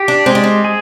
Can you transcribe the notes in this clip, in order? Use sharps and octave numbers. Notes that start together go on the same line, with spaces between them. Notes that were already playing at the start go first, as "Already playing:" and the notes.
Already playing: G4
D4
G#3 C4
D4
C4
G#4